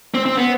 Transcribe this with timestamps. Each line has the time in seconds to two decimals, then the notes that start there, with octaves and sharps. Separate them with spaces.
0.14 C4
0.26 C4
0.37 B3